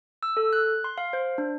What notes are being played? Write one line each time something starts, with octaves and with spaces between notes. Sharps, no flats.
E6
A4
F#6
C6
F5
C5
D4